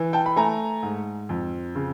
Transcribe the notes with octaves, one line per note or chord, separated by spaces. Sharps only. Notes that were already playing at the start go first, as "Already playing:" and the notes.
Already playing: E3
G5 A5
B5
A3 G#5 A#5
G#2
F2
C#3